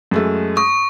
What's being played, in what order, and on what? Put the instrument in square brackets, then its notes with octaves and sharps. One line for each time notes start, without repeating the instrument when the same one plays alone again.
[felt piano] F#2 G#3 A3
[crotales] C#6 [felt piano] D#6